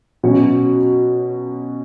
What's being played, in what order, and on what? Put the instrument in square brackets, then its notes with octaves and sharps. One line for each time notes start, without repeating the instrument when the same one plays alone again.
[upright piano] B2 F#3 C#4 F#4